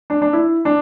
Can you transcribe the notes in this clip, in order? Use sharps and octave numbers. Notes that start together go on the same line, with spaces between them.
D4
D4
E4
D4